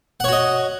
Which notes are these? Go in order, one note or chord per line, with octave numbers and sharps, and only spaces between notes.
F#4 C#5 D#5 F#5